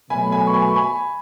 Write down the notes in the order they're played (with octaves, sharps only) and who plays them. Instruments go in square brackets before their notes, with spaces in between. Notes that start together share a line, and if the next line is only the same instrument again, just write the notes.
[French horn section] B2 F#3 A3 [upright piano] G#5 B5
[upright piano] G#5 B5
C#6
G#5 B5
C#6
G#5 B5